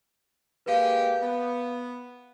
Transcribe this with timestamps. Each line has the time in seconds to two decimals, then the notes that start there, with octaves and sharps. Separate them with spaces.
0.66 G#3 A#3 G4 B4 F5
1.22 B3